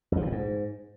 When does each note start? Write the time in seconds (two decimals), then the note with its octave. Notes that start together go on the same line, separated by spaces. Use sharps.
0.12 F2
0.17 F3
0.22 G#2
0.27 A2
0.32 G#2